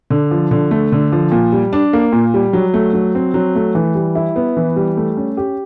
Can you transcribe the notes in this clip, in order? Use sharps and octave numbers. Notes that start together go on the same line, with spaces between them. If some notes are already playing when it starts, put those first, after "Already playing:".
D3
F3
D3
A3
D3
F3
A#2
G3
D4
A#3
A#2
G3
F#3
A3
F#3
C4
F#3
A3
E3
G3
E4
B3
E3
G3
A3
C#4
G4